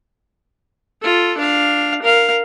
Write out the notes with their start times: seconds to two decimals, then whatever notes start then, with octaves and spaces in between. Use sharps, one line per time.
1.01 F4 A4
1.38 D4 F5
2.02 A#4 F5